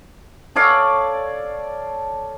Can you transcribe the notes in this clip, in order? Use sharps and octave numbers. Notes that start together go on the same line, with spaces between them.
A4 C#5 D5 F5